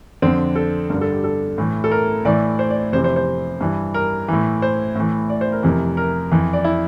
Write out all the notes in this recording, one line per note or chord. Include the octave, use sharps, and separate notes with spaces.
F2 D3 C4
A4
G2 D3 A#4
A4
G4
A4
A2 E3
A4
A#4
A2 E3 D5
C5
D5
F2 C3 E3 C5
C5
C5
G2 E3
A#4
A2 E3
C5
A2 E3
D5
C5
A#4
F2 C3 E3 A#4
A#4
F2 E3
D5
E4